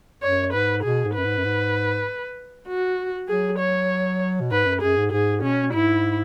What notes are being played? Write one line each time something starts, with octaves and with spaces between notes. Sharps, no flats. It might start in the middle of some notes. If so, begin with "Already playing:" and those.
F#2 C#5
G#2 B4
B2 G#4
G#2
F#2 B4
G#2
F#2
G#2
F#4
F#3 G#4
C#5
B2
G#2 B4
F#2
F#2 G#4
G#2
G#2 G#4
B2 C#4
G#2 E4